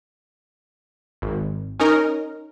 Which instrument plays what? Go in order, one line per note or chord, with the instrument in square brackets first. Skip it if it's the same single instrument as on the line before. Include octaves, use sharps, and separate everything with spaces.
[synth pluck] G#1
C#4 D#4 A#4 D#5